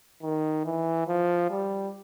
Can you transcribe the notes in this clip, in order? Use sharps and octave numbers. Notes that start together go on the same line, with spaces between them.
D#3
E3
F3
G3